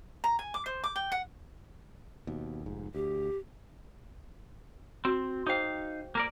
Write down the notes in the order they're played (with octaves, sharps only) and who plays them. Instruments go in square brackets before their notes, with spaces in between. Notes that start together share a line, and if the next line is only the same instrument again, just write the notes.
[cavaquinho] A#5
G#5
D6
C5
D6
G5
F#5
[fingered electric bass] D#2 B2
F1 G#2
[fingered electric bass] D2 [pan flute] G4
[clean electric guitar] C4 [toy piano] F#4
[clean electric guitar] D#4 F5 [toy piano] G#4 C5 G5
[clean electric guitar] A#3 A#4 D5